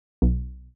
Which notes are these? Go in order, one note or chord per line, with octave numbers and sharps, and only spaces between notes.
B1